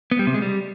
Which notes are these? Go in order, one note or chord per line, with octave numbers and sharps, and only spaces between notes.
B3
G3
C3
G#3
G3